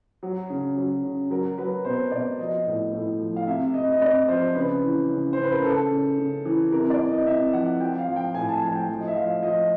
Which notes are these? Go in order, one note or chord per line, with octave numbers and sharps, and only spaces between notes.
F#3
C#3
F#3
C#3
F#3 A#4
F#3 B4
B2 C5
B2 D5
F3 D#5
A2
A2
F3
F5
C3 E5
C3 D#5
D#5
C3 D5
F3 C5
C#3 B4
E3
C#3
C#3 C5
B4
A#4
C#3 A4
C#3
C#3
E3
C3 A#4
D5
C3
D#5
C3 E5
F3 F#5
F3 G5
F5
F3
G5
A2 G#5
A5
F3 G#5
G5
F3
D#5
E5
F3 F5
F3 D#5